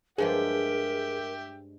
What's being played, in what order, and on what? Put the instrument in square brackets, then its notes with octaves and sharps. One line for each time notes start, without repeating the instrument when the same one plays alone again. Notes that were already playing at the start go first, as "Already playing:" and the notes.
[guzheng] G2 F3 G#3 [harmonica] G4 E5 G5 [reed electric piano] G#4 [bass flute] A#4